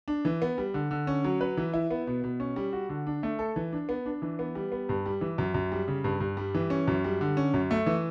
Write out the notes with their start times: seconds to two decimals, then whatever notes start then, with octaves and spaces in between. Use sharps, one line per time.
0.08 D4
0.25 E3
0.42 B3
0.58 G3
0.74 D3
0.91 D3
1.07 C#4
1.24 F#3
1.41 B4
1.57 E3
1.74 E4
1.91 B3
2.07 B2
2.24 B2
2.40 C#4
2.56 G3
2.73 F#4
2.89 D3
3.07 D4
3.23 A3
3.39 A4
3.56 E3
3.73 D4
3.89 B3
4.06 D4
4.22 E3
4.39 B3
4.55 G3
4.72 B3
4.89 G2
5.06 G3
5.21 E3
5.38 F#2
5.54 F#2
5.72 G3
5.88 C#3
6.04 G2
6.20 G2
6.37 G3
6.55 E3
6.70 C#4
6.88 F#2
7.04 G3
7.21 D3
7.37 C#4
7.54 F#2
7.71 A3
7.86 E3